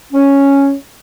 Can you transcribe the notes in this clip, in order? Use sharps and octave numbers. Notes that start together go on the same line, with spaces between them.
C#4